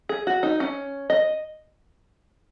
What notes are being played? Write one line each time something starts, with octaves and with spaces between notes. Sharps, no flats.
G#4
F#4
D#4
C#4
D#5